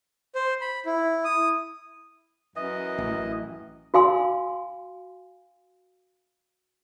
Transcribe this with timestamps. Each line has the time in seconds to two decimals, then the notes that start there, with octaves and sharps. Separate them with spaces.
0.35 C5
0.61 B5
0.86 E4
1.24 D#6
2.56 F#2 E3 D#5
2.98 A1
3.94 F#4 F5 G#5 C6